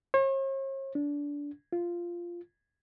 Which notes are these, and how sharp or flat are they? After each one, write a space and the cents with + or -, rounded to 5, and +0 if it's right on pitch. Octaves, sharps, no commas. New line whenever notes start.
C#5 -45
D4 -20
F4 -10